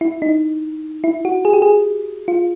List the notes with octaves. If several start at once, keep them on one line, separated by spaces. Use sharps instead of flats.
E4
D#4
E4
F#4
G#4
G4
G#4
F4